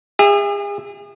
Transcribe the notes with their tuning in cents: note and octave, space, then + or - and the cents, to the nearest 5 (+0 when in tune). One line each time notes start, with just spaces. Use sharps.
G#4 -40 E5 +0